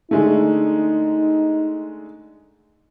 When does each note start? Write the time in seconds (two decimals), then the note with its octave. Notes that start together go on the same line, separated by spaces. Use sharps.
0.11 D3 G#3 A3 D#4